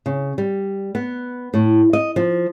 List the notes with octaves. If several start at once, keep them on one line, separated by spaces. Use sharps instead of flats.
C#3
G3
B3
A2
D#5
F3